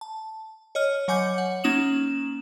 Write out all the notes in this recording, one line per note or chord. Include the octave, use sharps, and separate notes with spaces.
A5
C#5 D#5 F6
F#3 C#5 G#5 D6 G6 C#7
F#5
A#3 C#4 D#4 D#6 E7 F#7